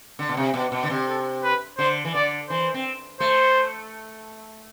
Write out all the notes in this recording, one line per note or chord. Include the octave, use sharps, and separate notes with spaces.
D3
B2
C3
B2
B2
D3
C3
A4
B4
D3 C5
E3
D3 D5
E3 C5
C4
A3 C5